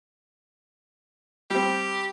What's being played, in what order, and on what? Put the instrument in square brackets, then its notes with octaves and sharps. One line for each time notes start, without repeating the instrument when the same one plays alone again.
[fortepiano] G3 C4 [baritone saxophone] G4